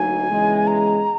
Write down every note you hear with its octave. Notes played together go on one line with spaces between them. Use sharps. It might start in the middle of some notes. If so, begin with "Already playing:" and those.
Already playing: D2 F#3 A#3 D#4 G#5
E2 C#3 E3 G#3
A#5